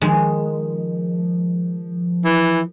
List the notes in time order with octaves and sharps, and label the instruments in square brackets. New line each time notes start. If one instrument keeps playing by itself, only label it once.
[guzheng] D#3 G#3 [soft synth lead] F3
[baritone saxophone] E3